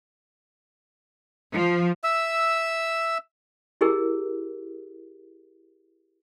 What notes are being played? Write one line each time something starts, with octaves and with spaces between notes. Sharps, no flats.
F3
E5 E6
E4 G4 G#4 A#4